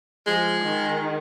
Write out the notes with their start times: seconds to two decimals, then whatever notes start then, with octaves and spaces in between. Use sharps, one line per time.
0.27 F3 G#3
0.62 D#3